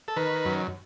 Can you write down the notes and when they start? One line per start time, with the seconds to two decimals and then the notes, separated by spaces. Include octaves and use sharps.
0.08 A4
0.16 D#3 B4
0.45 F#2